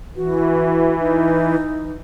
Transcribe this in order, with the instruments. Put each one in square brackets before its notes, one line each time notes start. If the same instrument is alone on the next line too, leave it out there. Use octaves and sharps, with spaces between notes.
[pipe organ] E3 [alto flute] F#4
[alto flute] D#4